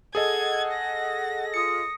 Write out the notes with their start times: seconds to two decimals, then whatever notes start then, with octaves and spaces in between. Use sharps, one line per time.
0.15 G#4 A4 D#5 F#5 G#6
0.73 A#6
1.54 F4 D#6 C#7